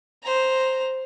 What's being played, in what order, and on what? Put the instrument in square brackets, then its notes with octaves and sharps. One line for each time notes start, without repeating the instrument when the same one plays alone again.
[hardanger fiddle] C5 A#5